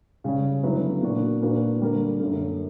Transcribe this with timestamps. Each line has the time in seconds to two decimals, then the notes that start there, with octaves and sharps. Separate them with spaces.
0.24 C#3 G3 C#4
0.63 D3 F#3 B3 E4 B4
1.02 A#2 A#3 D4 F#4 A#4
1.41 A#2 A#3 D4 F#4 B4
1.81 D3 G3 A#3 D4 A#4
2.20 F#2 D3 A#3